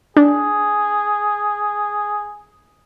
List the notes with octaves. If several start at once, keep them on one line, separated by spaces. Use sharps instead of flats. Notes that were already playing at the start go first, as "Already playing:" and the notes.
D4 G#4